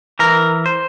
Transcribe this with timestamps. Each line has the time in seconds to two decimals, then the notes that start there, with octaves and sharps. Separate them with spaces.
0.19 E3 A#4
0.66 C5